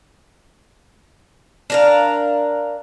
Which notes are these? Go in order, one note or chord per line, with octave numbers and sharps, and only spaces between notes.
D4 A#4 F5